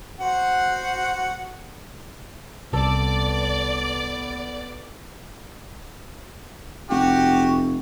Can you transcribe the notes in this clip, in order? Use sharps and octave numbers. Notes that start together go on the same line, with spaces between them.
F#4 C5 F#5
C2 B3 A4 D5
F1 F#4 G4